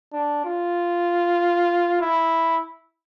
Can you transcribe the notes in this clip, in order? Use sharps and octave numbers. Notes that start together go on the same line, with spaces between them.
D4
F4
E4